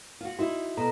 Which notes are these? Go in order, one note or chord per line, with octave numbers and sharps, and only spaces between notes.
F4 F#4
D#4 E4 F#4
B2 A4 A#5